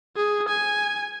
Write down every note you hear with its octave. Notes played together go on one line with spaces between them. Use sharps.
G#4
G#5